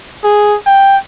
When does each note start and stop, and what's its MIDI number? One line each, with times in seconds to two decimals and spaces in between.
0.24 0.56 68
0.66 0.96 79